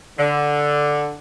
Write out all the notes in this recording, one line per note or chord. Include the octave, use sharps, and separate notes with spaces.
D3